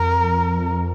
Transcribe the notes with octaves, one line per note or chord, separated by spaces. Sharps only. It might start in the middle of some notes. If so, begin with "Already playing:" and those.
Already playing: F2 A#4